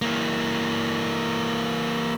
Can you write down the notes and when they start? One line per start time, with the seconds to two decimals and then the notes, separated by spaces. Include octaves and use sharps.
0.02 E3 A#3